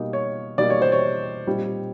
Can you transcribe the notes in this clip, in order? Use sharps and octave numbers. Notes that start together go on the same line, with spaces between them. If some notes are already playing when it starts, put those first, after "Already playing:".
Already playing: B2 G3 A#3 D#4
C#5
B2 G3 A#3 D#4 D5
C#5
C5
C#5
A#2 G3 C4 D#4